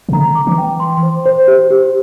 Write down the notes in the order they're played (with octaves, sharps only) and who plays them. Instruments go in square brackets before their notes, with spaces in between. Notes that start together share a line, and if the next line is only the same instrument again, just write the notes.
[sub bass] C3
[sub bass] D3 [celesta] A#5
[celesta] D6
[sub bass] E3
[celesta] G5
C6
C5
C5
G4
G4